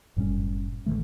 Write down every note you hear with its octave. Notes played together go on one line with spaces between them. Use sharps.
F#1 A2 G3 C#4
A1 D3 D#3 A3